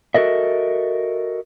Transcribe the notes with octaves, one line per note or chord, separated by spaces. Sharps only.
F#4 A4 A#4 D#5 E5